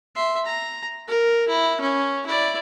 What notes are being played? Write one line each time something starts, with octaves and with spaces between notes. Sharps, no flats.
E5 C6
A#5
A#4
E4
C#4
E4 D5